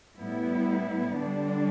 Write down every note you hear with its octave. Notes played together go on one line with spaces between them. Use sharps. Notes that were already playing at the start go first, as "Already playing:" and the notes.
A2 G3 B3 E4
D3 G3 D4